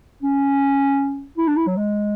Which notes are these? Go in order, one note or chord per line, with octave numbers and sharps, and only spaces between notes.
C#4
E4
D4
E4
F#3
G#3